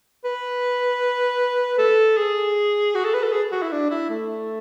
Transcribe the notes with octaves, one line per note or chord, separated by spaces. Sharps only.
B4
A4
G#4
F#4
A4
B4
A4
G#4
F#4
E4
D4
E4
A3